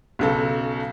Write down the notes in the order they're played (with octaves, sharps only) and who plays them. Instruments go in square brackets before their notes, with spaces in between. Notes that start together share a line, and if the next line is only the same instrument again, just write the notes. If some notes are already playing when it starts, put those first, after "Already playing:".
[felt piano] B1 C#3 A4